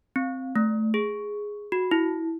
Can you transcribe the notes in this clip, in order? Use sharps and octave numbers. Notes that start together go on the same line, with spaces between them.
C4
A3
G#4
F#4
E4